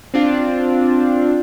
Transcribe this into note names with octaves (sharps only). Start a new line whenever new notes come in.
C4 D4 F4